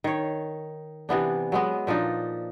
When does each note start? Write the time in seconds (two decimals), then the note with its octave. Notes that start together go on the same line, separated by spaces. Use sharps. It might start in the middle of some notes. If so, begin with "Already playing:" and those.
0.04 D#3 C#5
1.09 C3 E3 B3 D4
1.52 F#3 G#3 B3
1.87 A#2 F3 D4 D#4